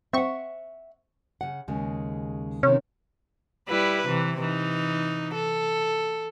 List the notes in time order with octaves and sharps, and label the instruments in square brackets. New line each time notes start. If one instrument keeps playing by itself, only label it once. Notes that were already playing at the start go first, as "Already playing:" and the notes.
[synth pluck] C4 C#6 [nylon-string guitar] E5 F#5
[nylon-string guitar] C#3 F#5
D#2 C#3 G#3
[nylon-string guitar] C3 D#3 [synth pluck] C#4
[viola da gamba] G3 E4 B4
C3 E3
E3 D#4
A4